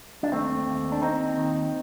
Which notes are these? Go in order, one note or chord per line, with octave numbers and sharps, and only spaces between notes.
D4
D#2 A3 C4
D#2
D4
D#2 C4 D#4
D#3